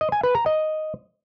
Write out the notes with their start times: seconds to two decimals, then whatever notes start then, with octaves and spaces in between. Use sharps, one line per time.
0.01 D#5
0.12 G#5
0.24 B4
0.35 A#5
0.46 D#5